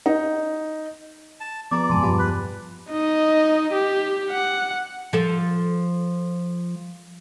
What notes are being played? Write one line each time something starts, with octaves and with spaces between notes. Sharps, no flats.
D#4
A5
F3 B3 G#4 D5 A#5 D6
E1 F2 G#2 F3 G#5 A5 C6
E1 G2 F3 G4 F5 A5 B5
B4
D#4 D#5
G4
F#5
F3 A4